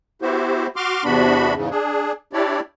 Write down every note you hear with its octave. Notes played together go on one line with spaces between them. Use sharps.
B3 E4 F#4 G4 C5
F#4 C6 D6 F6
E2 C3 B3 D4 F#4 B5
E2 G#2 C#3
D4 G#4
D4 E4 G4 C#5 D5